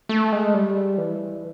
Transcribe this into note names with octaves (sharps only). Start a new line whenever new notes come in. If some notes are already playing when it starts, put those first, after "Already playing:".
A3
G#3
G3
E3